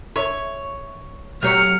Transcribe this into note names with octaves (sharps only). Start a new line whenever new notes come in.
C#5 E5
F#3 G4 C#5 F6 C#7